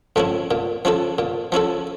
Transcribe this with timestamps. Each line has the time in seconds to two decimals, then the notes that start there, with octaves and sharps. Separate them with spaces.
0.16 A2 F3 C#4 E4
0.51 A#2
0.85 F3 C#4 E4 A4
1.18 A#2
1.52 F3 C#4 E4 A4